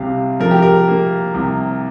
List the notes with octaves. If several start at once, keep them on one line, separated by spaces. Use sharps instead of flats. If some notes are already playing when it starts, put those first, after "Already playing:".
Already playing: C2 C3 F5
F3 A#4
G4
A#4
A#3
C2